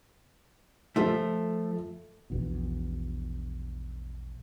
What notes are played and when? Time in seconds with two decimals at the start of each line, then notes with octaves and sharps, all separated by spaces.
0.96 F3 A3 A4
2.30 A#1 E2 B2